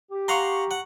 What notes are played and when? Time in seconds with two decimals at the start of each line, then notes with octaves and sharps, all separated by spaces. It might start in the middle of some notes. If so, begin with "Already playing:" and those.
0.11 G4
0.28 F5 F#5 A#5 C6 C#6
0.71 F#5